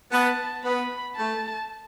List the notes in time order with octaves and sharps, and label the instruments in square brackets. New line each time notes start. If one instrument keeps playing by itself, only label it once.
[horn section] B3 [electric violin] A5
[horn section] B3 [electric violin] B5
[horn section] A3 [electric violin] A5